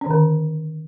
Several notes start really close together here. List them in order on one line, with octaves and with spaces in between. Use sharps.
C#4 D#3 D3